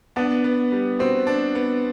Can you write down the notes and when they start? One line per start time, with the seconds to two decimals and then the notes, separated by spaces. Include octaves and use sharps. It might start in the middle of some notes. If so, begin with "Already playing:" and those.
0.16 B3 D4
0.44 B3
0.72 G3
0.99 C4 F#4
1.27 D4
1.55 B3